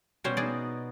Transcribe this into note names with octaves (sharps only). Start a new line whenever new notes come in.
B2 G3 C#4 C5
B3 D#4 G#4 D5